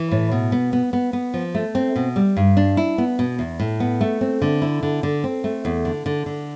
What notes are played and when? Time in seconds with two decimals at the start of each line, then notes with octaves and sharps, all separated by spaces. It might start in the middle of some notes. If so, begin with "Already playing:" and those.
Already playing: E3
0.11 A2
0.32 B2
0.52 B3
0.73 B3
0.93 B3
1.13 B3
1.34 F3
1.55 A3
1.75 C4
1.96 B2
2.16 G3
2.37 G2
2.57 D4
2.77 E4
2.98 B3
3.19 B2
3.39 E2
3.60 A2
3.80 B3
4.01 A3
4.21 C4
4.42 D3
4.62 E4
4.83 D3
5.03 D3
5.24 C4
5.44 A3
5.65 E2
5.85 D3
6.06 D3
6.26 D3